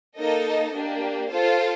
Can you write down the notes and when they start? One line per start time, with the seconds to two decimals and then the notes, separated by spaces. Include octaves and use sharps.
0.18 A#3 D#4 A4 D#5
0.74 A#3 D4 G4
1.30 F4 A4 C5 F5